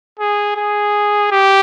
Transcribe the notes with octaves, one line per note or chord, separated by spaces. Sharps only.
G#4
G#4
G4